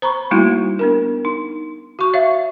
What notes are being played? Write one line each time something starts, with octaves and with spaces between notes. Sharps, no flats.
C5 A#5 B5 C#6
G3 A3 A#3 D#4 E4 F#4
B3 D4 A#4
D#4
F#4 C#6
C#5 E5 F5